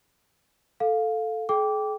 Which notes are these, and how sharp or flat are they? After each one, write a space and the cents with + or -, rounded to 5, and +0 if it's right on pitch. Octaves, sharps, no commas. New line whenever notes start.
A4 +0 F5 +10
G#4 +45 G5 +0 D6 -15